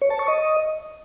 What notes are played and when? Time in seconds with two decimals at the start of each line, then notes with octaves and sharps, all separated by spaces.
0.01 C#5
0.10 A5
0.19 C#6
0.28 D#5